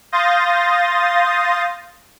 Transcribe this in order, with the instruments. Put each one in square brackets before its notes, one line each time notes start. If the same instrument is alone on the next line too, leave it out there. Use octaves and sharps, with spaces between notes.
[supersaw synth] F5 C6 D#6 G6 A6 A#6